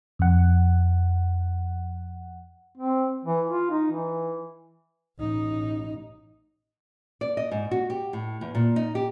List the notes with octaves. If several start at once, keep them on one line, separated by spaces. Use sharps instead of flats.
F2 F#5
C4
E3
F4
D#4
E3
A1 D#4
D5
D#5
G#2
F#4
G4
A2
E2
A#2
D#4
G4